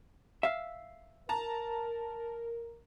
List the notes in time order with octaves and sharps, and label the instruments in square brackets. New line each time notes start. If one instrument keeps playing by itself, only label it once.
[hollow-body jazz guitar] E5 F5
[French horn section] A#4 [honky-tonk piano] A5 A#5